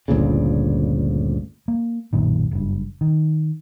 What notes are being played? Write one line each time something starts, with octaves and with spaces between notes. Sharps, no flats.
G1 D2 A#2 C#3
A#3
B1 F#2 A#2 D#3
F#1 G2
D#3